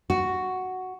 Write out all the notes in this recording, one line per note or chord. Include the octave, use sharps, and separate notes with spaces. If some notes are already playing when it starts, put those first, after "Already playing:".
F#4